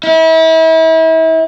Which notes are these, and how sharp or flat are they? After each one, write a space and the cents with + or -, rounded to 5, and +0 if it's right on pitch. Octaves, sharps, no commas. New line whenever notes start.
E4 -35